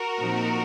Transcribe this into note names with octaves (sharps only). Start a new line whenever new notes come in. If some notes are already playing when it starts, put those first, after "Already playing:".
Already playing: F#4 A#4
A#2 F3 C4 D#4